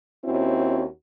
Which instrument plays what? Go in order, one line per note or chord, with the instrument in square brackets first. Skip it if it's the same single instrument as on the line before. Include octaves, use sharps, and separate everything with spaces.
[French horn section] D#2 C4 C#4 E4 F#4